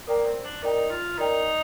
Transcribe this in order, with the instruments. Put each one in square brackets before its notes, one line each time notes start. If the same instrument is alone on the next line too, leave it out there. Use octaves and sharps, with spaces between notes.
[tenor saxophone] A#3 [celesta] A#4 D5 G5 A#5
[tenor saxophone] C4
D4
[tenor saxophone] D#4 [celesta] A#4 D5 G5 A#5
[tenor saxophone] F4
[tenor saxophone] D#4 [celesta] A#4 D5 G5 A#5